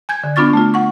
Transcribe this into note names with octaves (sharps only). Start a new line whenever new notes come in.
G#5 G6 G#6
D3
B3 D4 F4 C#6 A6
A3 F4
F#5 C#6